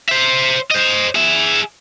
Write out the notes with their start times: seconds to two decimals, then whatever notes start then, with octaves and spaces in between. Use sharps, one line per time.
0.09 C5 E5
0.71 C5 D#5
1.15 G#4 E5